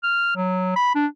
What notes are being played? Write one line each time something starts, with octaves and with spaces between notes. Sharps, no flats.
F6
F#3
B5
D4